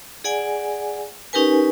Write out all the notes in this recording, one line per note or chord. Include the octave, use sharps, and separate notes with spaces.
G#4 D5 F#5 G#5
C#4 D#4 G4 A#4 B4 G#5